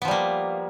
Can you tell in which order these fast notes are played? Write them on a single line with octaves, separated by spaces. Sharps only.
B3 F3 G3 A#3